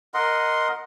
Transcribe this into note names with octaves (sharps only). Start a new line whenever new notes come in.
A#4 D#5 F#5 C6